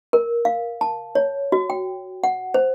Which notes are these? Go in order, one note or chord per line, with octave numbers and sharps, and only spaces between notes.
A#4
F5
A5
C#5
F#4
G5
F#5
C5